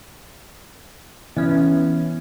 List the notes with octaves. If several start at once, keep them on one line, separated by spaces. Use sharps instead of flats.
E3 B3 C#4